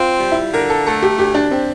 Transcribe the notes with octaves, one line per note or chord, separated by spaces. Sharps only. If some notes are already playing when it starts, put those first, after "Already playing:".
Already playing: C4 F4
G3
E4
D3 A#4
A4
A3 A4
G4
D2 G4
D4
C4